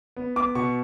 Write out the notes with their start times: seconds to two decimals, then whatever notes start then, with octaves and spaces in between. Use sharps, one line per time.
0.17 B3
0.36 B3 D6
0.55 B2 C#6